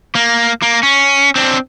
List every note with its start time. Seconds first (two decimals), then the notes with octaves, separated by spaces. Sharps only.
0.15 A#3
0.62 A#3
0.83 C#4
1.36 C4 D4